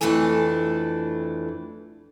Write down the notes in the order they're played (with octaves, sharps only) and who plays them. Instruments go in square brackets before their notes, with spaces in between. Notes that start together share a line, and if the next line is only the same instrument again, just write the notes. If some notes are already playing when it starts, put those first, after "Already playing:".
[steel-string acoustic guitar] F2 E3 A3 D4 A4 G#5